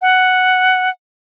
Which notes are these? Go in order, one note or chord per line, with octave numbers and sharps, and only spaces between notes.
F#5